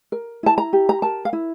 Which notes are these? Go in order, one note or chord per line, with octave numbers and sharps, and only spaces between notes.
A#4
E4 A5
A#5
G4
A#5
A#4 A5
F5
E4